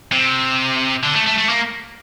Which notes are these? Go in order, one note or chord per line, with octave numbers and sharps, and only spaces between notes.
C3
D3
A3
A3
A3
A#3